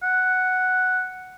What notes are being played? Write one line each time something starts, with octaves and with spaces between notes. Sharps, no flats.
F#5